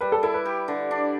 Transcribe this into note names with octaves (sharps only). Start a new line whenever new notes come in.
G3 B4
A4
E4 A4
B4
G4
D3
D4